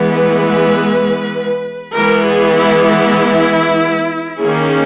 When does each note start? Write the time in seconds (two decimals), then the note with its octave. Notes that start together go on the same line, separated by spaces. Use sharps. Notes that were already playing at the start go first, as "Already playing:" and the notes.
Already playing: E3 G#3 B3
0.11 B4
1.95 E3 G#3 B3 A#4
2.25 G#4
2.56 E4
2.87 E4
4.40 D#3 A#3 C#4 G#4